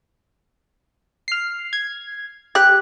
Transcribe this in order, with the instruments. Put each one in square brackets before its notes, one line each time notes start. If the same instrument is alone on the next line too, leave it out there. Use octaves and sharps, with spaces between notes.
[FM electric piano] F6 C7
G#6
[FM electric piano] G4 [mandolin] F#6